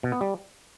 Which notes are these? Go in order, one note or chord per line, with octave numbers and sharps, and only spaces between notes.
B2
B3
G3